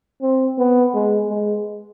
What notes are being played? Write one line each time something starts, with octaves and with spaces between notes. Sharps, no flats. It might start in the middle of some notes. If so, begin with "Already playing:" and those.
C4
B3
G#3
G#3